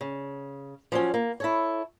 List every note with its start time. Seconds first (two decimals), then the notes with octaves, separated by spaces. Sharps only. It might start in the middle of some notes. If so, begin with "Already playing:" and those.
0.01 C#3
0.92 F3 F#3 C#4
1.14 A#3
1.40 E4 A4 C#5